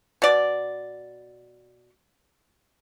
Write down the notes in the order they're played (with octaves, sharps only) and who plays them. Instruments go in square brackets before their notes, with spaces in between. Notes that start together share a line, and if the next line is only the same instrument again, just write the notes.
[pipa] B2 D5